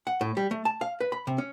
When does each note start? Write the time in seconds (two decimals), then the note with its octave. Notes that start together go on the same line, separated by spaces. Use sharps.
0.07 F#5
0.21 A2
0.37 G3
0.51 A3
0.65 A5
0.81 F5
1.01 B4
1.12 B5
1.27 C3
1.38 C#4